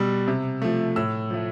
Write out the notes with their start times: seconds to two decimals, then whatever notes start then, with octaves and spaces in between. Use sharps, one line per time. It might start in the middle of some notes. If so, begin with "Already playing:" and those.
Already playing: B2 G3 E6
0.27 C3
0.62 F3 A3
0.96 A2 E6
1.30 F3 A3